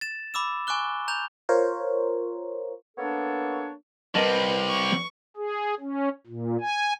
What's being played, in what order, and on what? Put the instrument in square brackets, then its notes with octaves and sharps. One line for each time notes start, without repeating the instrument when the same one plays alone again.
[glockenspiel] A6 E7
B5 D6 E6 E7
G#5 C#6 D6 F#6 G7
A#5 G6 F7
[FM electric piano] F4 A#4 C5 C#5
[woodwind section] A#3 B3 D4 A4 C#5
[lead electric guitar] G3 C4 [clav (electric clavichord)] A#4 D#5 A5 [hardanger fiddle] B4
[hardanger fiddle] C#6
[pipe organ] G#4
C#4
A#2
G#5